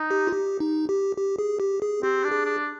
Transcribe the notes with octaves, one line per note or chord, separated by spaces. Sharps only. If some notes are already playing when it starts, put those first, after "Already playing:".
Already playing: D#4
G4
F4
G4
D#4
G4
G4
G#4
G4
G#4
C4 G4
D4
G#4
D4